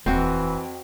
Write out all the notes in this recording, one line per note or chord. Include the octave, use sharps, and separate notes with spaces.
D#1 F2 E3 C4 F#4